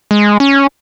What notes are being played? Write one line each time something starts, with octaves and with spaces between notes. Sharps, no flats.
G#3
C#4